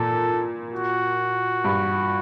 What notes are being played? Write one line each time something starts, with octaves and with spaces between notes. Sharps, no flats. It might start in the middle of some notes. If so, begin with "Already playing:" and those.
Already playing: A#2 A4
F#4
G2